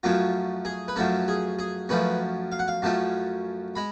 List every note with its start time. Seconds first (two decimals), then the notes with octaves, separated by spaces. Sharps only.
0.03 F#2 F3 A3 C#4 F4
0.65 G#4
0.88 B4
0.96 F#2 F3 A3 C#4 A4
1.28 G#4
1.59 G#4
1.89 F#2 F3 A3 C#4 B4
2.52 F5
2.59 F#5
2.68 F5
2.82 F#2 F3 A3 C#4 A5
3.76 G#3 B5